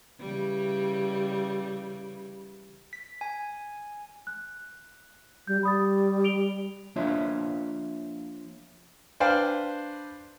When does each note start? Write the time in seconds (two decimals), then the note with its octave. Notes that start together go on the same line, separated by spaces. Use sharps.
0.20 C#3 E3 G3
2.93 B6
3.21 G#5
4.27 F#6
5.47 G3 G6
5.63 G3 B5 D#6 A6
6.24 D7 F7 G7
6.96 F3 A#3 D4 F4 C#5 E5
9.20 D4 B4 C5 D5 F5 G5